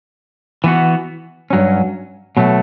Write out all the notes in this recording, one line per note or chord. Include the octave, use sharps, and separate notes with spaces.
E3 B3 F#4
G2 F#3 C#4
B2 F#3 A3